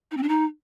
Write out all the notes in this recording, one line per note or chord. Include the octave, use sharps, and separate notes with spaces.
D#4
C4
D4
D#4